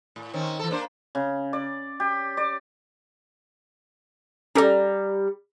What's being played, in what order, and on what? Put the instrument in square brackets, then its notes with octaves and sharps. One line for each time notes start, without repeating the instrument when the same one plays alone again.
[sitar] A2
D#3 C4 C#4
E3 A4
A#3 D4 C5
[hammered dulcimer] C#3
D5
G4
D5
[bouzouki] G3 A#5 [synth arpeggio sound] C#4 G4 A4